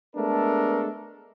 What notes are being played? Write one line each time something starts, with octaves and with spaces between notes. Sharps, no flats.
G#3 A3 B3 D4 A4 A#4